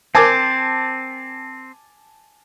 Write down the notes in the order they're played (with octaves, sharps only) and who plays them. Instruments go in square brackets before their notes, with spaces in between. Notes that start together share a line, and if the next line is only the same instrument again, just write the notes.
[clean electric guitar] C4 [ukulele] A#4 C5 [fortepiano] G#5 A5 D6